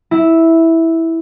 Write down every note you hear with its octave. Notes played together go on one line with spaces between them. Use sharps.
E4